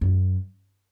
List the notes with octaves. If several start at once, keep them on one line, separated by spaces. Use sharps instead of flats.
F#2